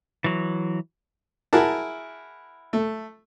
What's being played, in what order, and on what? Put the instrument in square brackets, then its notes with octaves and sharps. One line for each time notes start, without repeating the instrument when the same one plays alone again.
[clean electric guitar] E3 F#3
[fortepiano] E4 F#4 G#4 A#4 A5
A3